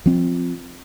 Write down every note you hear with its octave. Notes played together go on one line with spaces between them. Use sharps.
F3 C4